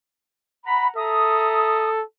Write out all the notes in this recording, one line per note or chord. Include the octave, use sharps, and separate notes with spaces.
F#5 A#5 B5
A4 E5 A#5 D#6